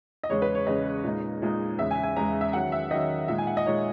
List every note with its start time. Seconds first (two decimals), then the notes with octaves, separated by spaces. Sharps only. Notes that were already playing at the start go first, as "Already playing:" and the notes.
0.23 D#5
0.29 E2 C#3 G#3 C#4 C#5
0.42 B4
0.55 C#5
0.67 E2 C#3 G#3 C#4 D#5
1.04 A#2 G#3 D#4
1.42 A#2 G#3 D#4
1.78 E2 C#3 G#3 E5
1.91 G#5
2.03 G#5
2.16 E2 C#3 G#3 A#5
2.41 E5
2.53 D#3 F#3 C#4 F#5
2.72 E5
2.91 D#3 F#3 C#4 D#5
3.28 A#2 G#3 D#4 E5
3.38 G#5
3.47 F#5
3.57 D#5
3.65 A#2 G#3 D#4 C#5